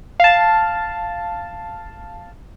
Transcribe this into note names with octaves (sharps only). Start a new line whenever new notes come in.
F5 A5